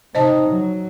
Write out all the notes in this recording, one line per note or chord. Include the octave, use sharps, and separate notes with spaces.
C3 D#4 C5 D#5 A5
F#3